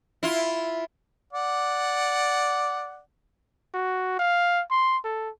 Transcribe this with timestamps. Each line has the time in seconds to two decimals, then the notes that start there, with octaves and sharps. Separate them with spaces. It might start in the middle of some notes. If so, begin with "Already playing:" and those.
0.23 E4 F4
1.33 D5 F#5
3.74 F#4
4.19 F5
4.71 C6
5.05 A4